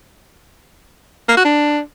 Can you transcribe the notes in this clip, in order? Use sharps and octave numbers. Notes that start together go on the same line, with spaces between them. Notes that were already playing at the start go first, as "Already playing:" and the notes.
A#3
F#4
D4